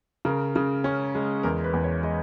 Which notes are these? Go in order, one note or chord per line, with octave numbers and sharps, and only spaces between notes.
C#3 A#4
C#3
C#4
G#3
E2 A#4
B4
E2
C#5
G#3 D#5